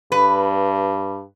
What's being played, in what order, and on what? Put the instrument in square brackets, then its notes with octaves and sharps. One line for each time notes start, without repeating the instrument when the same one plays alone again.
[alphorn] G2 [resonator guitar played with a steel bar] B4